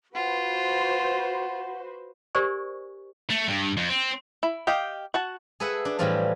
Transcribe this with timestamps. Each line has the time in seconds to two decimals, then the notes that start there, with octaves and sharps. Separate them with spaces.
0.15 F4 F#4 B4 C5 F#5
2.35 G4 A#4 C5 D5 G#5 C#6
3.30 A3
3.48 G2
3.77 F2
3.89 C4
4.43 E4
4.67 G4 D#5 F5 G5
5.14 F#4 F#5 A5
5.60 G#4 A4 B4 E5 F#5
5.85 D4
5.99 A2 E3 F3 G3 D4 F4